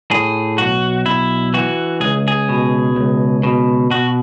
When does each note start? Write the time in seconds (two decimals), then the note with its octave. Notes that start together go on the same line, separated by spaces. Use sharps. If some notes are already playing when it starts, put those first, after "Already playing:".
0.11 A2 G#4
0.58 B1 F#4
1.06 B1 E4
1.54 E3 F#4
2.00 C#2 G#4
2.28 G#4
2.49 B2
2.96 C#2
3.43 B2
3.91 B2 F#4